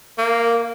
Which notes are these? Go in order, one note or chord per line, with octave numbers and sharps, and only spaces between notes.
A#3